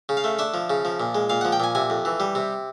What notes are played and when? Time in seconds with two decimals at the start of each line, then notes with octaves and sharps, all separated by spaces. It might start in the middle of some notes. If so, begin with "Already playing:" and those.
0.09 C#3
0.17 F5
0.24 A3
0.39 D4 E5
0.54 F3
0.70 C#3
0.85 F3
1.00 A#2
1.15 G#3
1.30 A#2 F5
1.41 F3 F#5
1.52 G5
1.60 A#2 G#5
1.75 C3 G#5
1.90 F2
2.05 E3
2.20 G3
2.35 C3